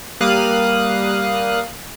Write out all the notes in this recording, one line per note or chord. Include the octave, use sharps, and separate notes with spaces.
G3 A#3 F5 D#6 F#6